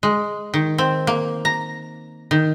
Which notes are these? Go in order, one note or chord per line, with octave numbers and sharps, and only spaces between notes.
G#3
D#3
C4
A#3
A#5
D#3